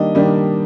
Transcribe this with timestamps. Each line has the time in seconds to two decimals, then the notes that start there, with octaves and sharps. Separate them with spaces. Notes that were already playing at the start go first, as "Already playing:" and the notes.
Already playing: D#3 G3 A#3 D4 D#5
0.15 D#3 G3 A#3 D4